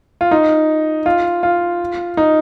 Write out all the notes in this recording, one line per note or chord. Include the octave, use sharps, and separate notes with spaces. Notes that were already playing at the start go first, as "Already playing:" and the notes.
F4
D#4
F4
F4
D#4